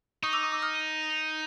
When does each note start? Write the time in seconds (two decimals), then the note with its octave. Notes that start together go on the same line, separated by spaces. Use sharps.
0.23 D#4 C#6 D#6
0.33 D6 E6
0.43 C#6 D#6
0.52 D6 E6
0.62 D#6 F6